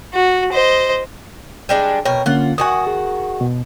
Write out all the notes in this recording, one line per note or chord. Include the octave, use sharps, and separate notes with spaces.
F#4
C5 D#5
G3 G#3 D4
B2 A#4 C#5 G5
D3 A#3 C#4 F4 F#5
D#3 F#4 F#5 G#5 D#6
G#4
B2